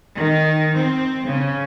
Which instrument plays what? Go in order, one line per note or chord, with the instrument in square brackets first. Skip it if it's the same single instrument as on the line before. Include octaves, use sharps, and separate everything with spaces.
[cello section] D#3
C4
C#3